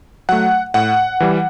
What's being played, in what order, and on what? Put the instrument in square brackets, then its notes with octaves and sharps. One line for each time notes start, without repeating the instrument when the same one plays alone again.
[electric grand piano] F#3 A3 F#5
A2 F#5
E3 G3